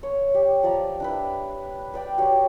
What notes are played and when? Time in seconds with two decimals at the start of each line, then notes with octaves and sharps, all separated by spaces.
0.03 C#5
0.34 G4
0.63 F3 D5 A#5
1.00 D4 E4 B4
1.94 B4 D5 G5
2.18 F#4 G4 C#5